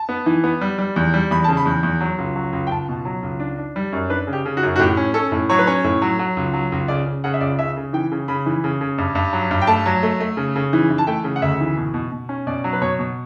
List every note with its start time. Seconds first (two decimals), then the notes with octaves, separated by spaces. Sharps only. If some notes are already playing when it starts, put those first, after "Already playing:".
Already playing: A5
0.09 B3
0.26 E3
0.44 B3
0.61 G3
0.78 G3
0.96 E2
1.14 G3
1.31 E2 B5
1.44 C#3 A5
1.57 B5
1.65 E2
1.83 E2
2.01 F#3
2.18 C#2
2.36 F#3
2.53 C#2
2.67 G5
2.71 C#2 A5
2.89 B2
3.05 F#3
3.23 C#2
3.40 D4
3.58 D4
3.76 G3
3.93 F#2
4.10 D4 B4
4.27 C#3
4.33 G4
4.45 C#3
4.57 F#4
4.63 F#2
4.76 F#4
4.79 A2 G4
4.97 C#4
5.14 C#4 A4
5.32 A2
5.50 F#3 C#5
5.59 B4
5.67 C#4 C#5
5.84 A2
6.02 F#3
6.19 F#3
6.37 C#2
6.53 F#3
6.72 C#2
6.88 C#3 D5
7.06 C#3
7.24 C#3 F#5
7.34 E5
7.41 C#2 D5
7.58 C#3 E5
7.77 C#3
7.93 E3 G5
8.12 C#3
8.28 C#3 B5
8.46 E3
8.64 C#3
8.81 C#3
8.98 G2
9.15 G2
9.33 F#3
9.51 G2
9.62 G5
9.67 A3 A5
9.86 F#3
10.03 A3
10.20 A3
10.37 C#3
10.56 C#3
10.73 E3
10.90 E3
10.98 A5
11.07 A3 G5
11.24 C#3
11.36 F#5
11.42 D2 E5
11.60 E3
11.77 B2
11.94 B2
12.12 B2
12.29 C#4
12.47 B2 D5
12.64 F#3
12.73 B4
12.81 B2 C#5
12.99 B2